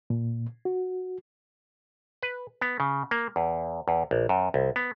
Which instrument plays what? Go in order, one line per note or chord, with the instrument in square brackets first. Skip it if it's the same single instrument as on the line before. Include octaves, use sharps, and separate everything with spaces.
[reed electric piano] A#2
F#4
[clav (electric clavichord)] B4
B3
C#3
A#3
E2
E2
A#1
F#2
C2
B3